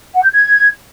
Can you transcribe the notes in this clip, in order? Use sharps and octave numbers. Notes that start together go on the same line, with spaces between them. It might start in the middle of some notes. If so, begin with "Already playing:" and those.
F#5
G6
G#6